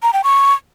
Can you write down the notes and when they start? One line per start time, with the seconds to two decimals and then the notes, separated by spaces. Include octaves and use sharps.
0.03 A#5
0.13 G5
0.24 C#6